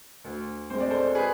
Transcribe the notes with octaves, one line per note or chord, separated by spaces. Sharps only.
D2
C3 G#3 C5
D5
A4 C5
G#4 B4